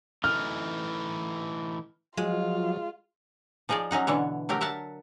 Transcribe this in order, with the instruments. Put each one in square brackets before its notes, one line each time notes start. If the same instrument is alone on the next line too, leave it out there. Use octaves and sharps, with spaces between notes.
[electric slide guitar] E3 A3 D#4 [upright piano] F6
[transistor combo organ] F3 F#3 [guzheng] G#3 [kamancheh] F4
[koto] F3 D#4 G#4 C#5 D5
F#3 C#4 D#4 F#5
B2 D3 E3 C#5
F#3 A3 G4 A#4
A#4 E5 F#5 A5